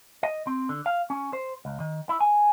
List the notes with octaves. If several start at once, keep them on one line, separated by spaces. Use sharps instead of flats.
D#5
C4
D3
F5
C#4
C5
C#2
D#3
E4
G#5